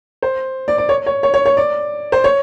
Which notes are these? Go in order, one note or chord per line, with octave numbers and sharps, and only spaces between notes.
C5
D5
D5
C#5
C#5
C#5
C#5
C#5
D5
C5
C#5